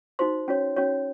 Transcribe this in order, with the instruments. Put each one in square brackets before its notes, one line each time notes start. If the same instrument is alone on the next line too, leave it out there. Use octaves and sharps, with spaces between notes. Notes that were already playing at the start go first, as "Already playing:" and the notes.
[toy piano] D#4 F#4 C5 C6
C#4 F#4 C#5
C#4 F#4 C#5